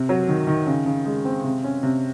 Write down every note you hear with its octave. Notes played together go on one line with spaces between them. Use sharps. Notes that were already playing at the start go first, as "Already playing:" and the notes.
Already playing: C3
F#3
D#3
D#3
C#3
C#3
G#3
C4
C3
C#4
C3